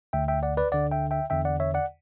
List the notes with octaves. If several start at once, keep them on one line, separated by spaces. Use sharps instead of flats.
D2 D3 E5 G5
E5 G5
D5 F#5
B4 D5
D2 D3 D5 F#5
E5 G5
E5 G5
E2 D3 E5 G5
D5 F#5
C#5 E5
D5 F#5